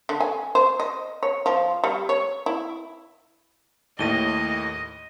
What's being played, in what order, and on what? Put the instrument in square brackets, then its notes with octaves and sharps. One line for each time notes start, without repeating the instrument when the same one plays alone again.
[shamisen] D3
G#5
C5
D#5
C#5
F3
G3
C#5
E4
[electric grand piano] D#2 A2 [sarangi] D#5 [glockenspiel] A#6 D#7 G7